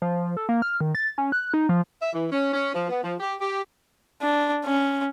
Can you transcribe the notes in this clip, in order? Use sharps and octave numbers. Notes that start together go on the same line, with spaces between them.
F3
A4
A#3
F6
D#3
A6
C#4
F#6
D#4
F3
E5
E3
C#4
C#4
F3
B3
F3
G4
G4
D4
C#4